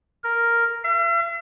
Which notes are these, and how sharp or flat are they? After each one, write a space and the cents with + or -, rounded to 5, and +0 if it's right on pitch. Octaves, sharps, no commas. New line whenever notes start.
A#4 +0
E5 +45